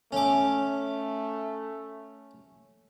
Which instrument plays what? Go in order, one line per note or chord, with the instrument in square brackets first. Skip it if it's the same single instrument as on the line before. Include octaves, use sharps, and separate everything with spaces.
[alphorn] A3 [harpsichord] C#4 D6